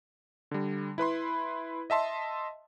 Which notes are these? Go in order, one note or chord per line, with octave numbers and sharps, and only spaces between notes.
D3 G3
E4 B4 B5 C6
D#5 E5 A5 C6